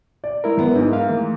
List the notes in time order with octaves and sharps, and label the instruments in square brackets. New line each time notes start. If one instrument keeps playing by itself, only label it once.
[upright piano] D5
[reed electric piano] G#3 E4 A#4
[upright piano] F#2 B3
[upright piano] G#2 G#3 [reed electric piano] D#4 E4
[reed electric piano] A#4 E5 F5
E3 A3 A#3